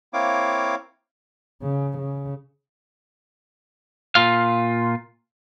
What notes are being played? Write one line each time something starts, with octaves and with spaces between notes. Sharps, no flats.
A#3 C4 E4 C#5 F5 D6
C#3
C#3
A#2 F4 F5